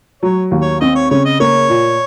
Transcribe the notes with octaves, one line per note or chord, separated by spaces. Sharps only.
F#3 C#5
D#2
C#5
C4 D#5
C#5
C#3 C#5
D#5
A#3 C#5
A#2